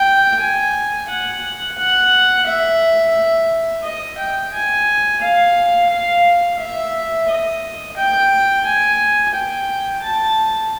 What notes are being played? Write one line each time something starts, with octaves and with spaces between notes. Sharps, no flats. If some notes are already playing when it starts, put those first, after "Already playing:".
Already playing: G5
G#5
F#5
F#5
E5
D#5
G5
G#5
F5
F5
E5
D#5
G5
G#5
G5
A5